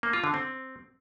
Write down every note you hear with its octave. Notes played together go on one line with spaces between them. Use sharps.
A#3
F4
D3
C4